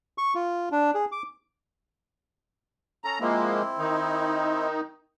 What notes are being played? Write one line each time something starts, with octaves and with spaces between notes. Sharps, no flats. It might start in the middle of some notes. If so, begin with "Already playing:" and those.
C#6
F4
D4
G#4
D6
C#4 A4 A#5
F3 G#3 A#3 C4 E4
D#3 D#4